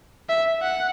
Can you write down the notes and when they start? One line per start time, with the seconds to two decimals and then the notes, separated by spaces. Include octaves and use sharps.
0.29 E5
0.62 F#5